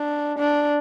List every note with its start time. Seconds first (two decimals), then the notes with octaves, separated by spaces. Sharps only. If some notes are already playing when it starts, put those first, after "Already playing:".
Already playing: D4
0.39 D4